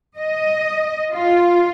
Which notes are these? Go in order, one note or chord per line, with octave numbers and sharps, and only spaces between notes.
D#5
F4